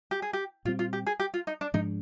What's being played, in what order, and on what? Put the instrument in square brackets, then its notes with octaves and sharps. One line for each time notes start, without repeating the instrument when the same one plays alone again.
[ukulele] G4
G#4
G4
[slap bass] A#2 G3 C4 [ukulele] F4
[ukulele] F4
G4
G#4
G4
F4
D#4
D4
[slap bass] G#2 F3 G#3 D4 [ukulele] D#4